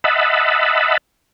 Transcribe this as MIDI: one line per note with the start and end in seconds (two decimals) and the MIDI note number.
0.04 0.97 75
0.04 0.97 76
0.04 0.97 78
0.04 0.97 81
0.04 0.97 83